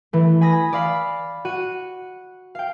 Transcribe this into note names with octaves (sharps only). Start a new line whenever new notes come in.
E3 A3
G#5 B5 D#6 A#6
D5 F5 B5
F#4 F#5 D#7
F5 G5